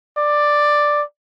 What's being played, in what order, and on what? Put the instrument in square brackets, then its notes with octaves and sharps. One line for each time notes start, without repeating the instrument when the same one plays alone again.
[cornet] D5